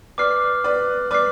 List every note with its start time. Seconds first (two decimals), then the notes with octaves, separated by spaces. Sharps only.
0.18 B4 D5 D6 F6 C7
0.64 B4 D5
1.11 B4 D5 D6 F6 C7